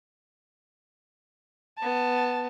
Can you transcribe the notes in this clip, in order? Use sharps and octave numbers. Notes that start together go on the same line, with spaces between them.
B3 A5